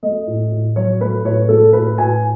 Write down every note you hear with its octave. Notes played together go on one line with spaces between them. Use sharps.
A3 D#5
A2
A2
F#3 C#5
A3 B4
A2 C#5
A3 A4
A2 B4
A2 G#5